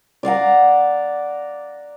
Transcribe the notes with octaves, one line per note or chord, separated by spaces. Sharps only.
D5 F5 F#5 A#5